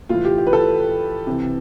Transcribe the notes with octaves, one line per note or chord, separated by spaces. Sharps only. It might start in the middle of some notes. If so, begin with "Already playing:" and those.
A2 E3 F4
G4
G4
B4
A4
C3 E3